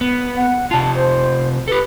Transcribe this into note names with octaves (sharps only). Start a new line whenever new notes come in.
B3
F#5
C3 F4 A5
C5
G4 A4 B4